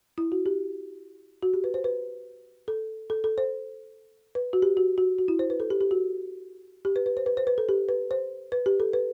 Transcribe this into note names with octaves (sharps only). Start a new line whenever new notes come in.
E4
F#4
G4
F#4
G4
B4
C5
B4
A4
A4
A4
C5
B4
F#4
G4
F#4
F#4
F#4
E4
C5
B4
A4
G4
G4
F#4
G4
B4
B4
C5
B4
C5
B4
A4
G4
B4
C5
B4
G4
A4
B4